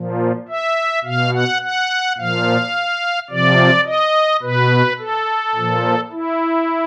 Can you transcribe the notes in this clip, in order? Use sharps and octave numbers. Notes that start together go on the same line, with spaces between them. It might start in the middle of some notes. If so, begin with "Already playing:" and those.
Already playing: A#2 F3
E5
B2 F5
F#5
F#5
A#2 F3 F5
C3 F3 D5
D#5
B2 B4
A4
A#2 F3
E4